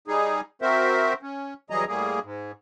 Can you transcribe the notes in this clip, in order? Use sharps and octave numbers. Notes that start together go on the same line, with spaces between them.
G3 D#4 G#4
C4 F#4 A#4 C5 E5
C#4
E3 F#3 G3 G#4 D#5 A#5
A2 G3 A#3 G#4
G#2